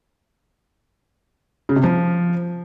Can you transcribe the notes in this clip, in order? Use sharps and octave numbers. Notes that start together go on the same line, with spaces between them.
C#3
C3
F3